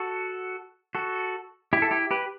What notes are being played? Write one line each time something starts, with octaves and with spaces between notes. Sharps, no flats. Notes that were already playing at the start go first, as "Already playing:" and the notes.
Already playing: F#4 A4
F#4 A4
E4 G4
A4
E4 G4
G4 B4